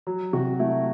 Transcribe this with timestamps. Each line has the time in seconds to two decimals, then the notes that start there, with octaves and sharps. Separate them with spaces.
0.07 F#3
0.33 C3 F#4
0.59 A3 E4